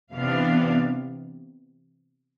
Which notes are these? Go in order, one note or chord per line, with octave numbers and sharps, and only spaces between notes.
C3 E3 B3 D4 F5